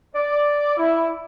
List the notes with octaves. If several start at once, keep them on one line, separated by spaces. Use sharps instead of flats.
D5
E4